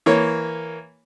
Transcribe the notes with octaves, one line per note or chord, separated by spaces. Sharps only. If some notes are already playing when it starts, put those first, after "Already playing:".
E3 A#3 C#5